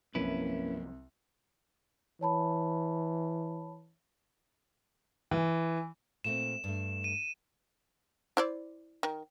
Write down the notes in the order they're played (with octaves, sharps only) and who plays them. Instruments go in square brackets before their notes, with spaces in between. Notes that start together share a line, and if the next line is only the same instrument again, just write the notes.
[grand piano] C2 [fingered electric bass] G2 F3 F#3 [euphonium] A#3 [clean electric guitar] C#4 E4 B4
[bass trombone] E3 [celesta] C#5 A5 B5
[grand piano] E3
[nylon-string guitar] A#2 A3 C4 [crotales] E7
[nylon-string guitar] G2 A3
[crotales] D#7
[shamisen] E4 C5 D5
D#3